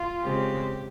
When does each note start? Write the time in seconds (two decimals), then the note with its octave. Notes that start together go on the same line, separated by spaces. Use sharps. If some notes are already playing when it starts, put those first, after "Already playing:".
Already playing: F4
0.24 C#3 G#3 C4 G4